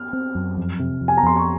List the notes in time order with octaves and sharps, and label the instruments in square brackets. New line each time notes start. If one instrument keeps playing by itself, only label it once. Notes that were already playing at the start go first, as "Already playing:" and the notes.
Already playing: [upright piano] F6
[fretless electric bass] C4
F#2
F2
C3
F2
[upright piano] G#5
A#5
[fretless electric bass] F2 [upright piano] C6
[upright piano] C#6